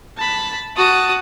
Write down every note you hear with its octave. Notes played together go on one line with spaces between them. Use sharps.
A5 B5
F#4 A5 D#6